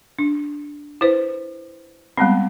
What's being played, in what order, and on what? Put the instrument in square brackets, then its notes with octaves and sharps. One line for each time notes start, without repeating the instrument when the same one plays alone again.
[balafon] D4
E4 B4 C5
G3 G#3 B3 C4